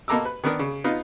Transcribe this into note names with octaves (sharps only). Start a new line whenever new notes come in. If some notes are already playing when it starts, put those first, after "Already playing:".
B2 A#3 A4 A#5 D6 E6
B4
D#3 B3 D4 A#4 D#6
C#3
B3 D#4 F4